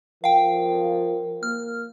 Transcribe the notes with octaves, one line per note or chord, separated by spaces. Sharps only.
F3 A#4 F5 G5
A#3 F6